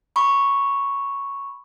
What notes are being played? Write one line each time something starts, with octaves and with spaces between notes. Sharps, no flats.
B5 C#6